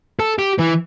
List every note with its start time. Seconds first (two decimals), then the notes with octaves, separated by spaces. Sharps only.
0.19 A4
0.39 G4
0.59 E3